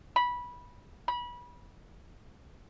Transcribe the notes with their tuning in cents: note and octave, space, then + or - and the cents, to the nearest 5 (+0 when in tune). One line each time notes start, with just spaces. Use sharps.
B5 -15
B5 -25